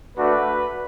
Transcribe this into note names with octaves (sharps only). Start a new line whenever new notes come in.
A3 D4 F#4 B4